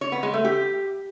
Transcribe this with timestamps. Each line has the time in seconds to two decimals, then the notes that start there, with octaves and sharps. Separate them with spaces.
0.01 C#5
0.12 B3
0.23 G#3
0.34 A3
0.44 G4